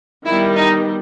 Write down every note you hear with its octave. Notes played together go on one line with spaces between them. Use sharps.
D#3 G3 B3 E4
D#4